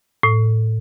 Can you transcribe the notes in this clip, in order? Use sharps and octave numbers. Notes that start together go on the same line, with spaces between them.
A2